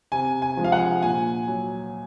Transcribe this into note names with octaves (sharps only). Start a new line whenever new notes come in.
C3 G#5
G#5
F3 G#3
F5
F#5
A#2 G#5
F#3